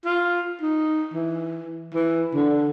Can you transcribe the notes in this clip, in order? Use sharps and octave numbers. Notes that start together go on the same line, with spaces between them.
F4
D#4
E3
E3
D3